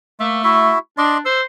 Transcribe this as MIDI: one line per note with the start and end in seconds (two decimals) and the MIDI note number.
0.20 0.72 57
0.20 0.42 58
0.20 0.42 76
0.44 0.79 64
0.44 0.79 66
0.44 0.79 76
0.98 1.20 62
0.98 1.18 74
0.98 1.18 75
0.98 1.18 84
1.25 1.43 72
1.25 1.40 88